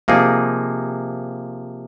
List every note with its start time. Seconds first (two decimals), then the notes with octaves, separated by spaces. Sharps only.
0.08 C3 F3 A#3 D#4 G#4